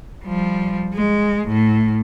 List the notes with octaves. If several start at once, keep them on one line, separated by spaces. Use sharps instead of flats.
F3 G3
G#3
A2